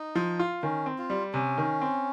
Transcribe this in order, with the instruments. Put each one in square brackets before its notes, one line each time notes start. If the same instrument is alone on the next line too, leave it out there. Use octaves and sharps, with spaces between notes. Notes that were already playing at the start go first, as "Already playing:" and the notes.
Already playing: [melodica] D#4
[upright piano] F3
F4
[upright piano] D#3 [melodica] C#4
[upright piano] C4
[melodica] F4
[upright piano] G3
[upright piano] C3 [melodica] C#4
[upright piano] D#3
C4